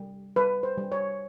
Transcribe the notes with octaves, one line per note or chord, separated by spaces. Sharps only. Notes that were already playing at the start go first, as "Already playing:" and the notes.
Already playing: G3
G3 B4
C5
G3
C#5